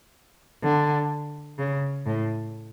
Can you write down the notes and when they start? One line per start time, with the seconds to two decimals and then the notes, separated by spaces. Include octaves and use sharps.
0.64 D3
1.59 C#3
2.06 A2